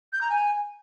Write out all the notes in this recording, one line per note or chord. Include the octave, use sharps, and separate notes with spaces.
G6
A#5
G#5